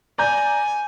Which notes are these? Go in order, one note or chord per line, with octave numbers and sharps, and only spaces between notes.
D5 G#5 A#5 G6